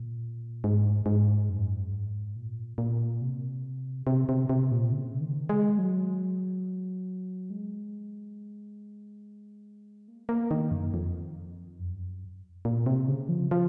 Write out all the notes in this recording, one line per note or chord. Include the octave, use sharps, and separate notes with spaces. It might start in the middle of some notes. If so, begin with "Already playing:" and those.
Already playing: A#2
G#2
G#2
F#2
G#2
A#2
A#2
C3
C3
C3
C3
A#2
C#3
D#3
G#3
F#3
G#3
A#3
A#3
D#3
F#2
F2
F#2
A#2
C3
C#3
F3
F3